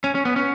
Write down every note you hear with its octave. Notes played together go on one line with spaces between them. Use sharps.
C#4
C#4
B3
C#4